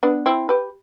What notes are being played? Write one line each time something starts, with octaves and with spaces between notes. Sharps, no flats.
B3 D4
C4 E4
G4 B4